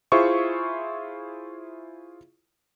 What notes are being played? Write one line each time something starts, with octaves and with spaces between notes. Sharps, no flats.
E4 F4 G#4 C5 E5 C#6